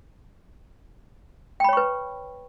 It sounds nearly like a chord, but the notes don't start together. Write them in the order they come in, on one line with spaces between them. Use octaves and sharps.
G5 B5 C#5 C#6 B4